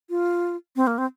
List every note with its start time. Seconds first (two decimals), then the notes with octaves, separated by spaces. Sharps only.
0.10 F4
0.76 C4
0.87 A#3
0.98 C4